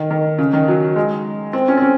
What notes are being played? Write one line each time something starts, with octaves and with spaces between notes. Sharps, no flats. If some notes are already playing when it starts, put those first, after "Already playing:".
Already playing: D#3
D#3
C#3
D#3
F#3
G#3
C4
C#4
C4
C#4